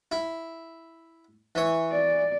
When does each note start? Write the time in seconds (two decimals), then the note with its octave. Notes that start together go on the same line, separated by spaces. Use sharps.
0.12 E4
1.55 E3 C#5
1.92 D5